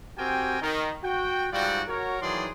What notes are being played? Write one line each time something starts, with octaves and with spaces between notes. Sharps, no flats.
C4 F#4 G4 A#4 G5 G#5
D#3
F#4 G5
G#2 G3 F4 F#4 D5 G5
F#4 A#4 C#5
D#3 E3 F#3 G#4 D5 C6